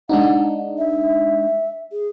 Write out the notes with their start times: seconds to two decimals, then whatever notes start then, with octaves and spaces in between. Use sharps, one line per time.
0.09 G#3 D4 D#4 F#5
0.78 E5
1.92 G#4